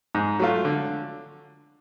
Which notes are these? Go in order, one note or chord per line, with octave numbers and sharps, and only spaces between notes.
G#2
F#3 A3 F4
D3